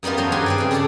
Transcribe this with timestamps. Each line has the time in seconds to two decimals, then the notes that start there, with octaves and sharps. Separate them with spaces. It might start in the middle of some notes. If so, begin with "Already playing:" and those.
0.03 F#2 G3 B3 D#4 F4
0.17 F3 F#3 C5 C#5
0.32 G2 G4 G#4 B4 G#5 C6
0.46 C4 B4 D5
0.58 C#3 G5
0.71 G#4 A4 C#5 D5 A5